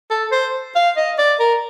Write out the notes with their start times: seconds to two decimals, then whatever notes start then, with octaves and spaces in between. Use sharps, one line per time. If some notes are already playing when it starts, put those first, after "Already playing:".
0.10 A4
0.32 C5
0.76 F5
0.97 D#5
1.19 D5
1.40 A#4